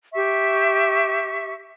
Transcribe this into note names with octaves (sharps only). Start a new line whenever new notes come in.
G4 E5 C#6